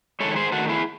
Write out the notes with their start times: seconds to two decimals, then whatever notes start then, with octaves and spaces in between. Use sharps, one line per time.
0.20 G#3 A4 C#5
0.24 D#3
0.31 C#5
0.36 G#4 C5
0.52 D#3 A3 F#4 A4
0.69 E4 G#4